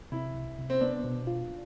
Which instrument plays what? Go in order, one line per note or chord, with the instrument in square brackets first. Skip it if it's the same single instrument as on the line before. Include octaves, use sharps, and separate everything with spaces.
[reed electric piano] C3 [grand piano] E4
[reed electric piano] C2
C3
[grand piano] C4
[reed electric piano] B3 [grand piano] D4
[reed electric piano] B2
F4